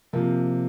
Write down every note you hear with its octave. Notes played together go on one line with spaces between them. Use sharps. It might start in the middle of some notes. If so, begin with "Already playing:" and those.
C3 F3 A#3